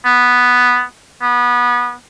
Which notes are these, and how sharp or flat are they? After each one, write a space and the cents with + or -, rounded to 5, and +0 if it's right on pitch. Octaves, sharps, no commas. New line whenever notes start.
B3 +0
B3 -20